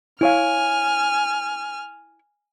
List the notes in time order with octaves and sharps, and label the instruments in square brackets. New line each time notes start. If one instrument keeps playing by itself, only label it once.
[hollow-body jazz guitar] E4 C#5 F5 [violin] G#5 F6